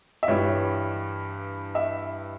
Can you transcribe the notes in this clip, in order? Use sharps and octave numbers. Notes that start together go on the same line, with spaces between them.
E5
G2 E3 G3 C#5
E5